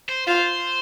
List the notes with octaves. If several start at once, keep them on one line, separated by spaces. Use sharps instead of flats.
C5
F4 C5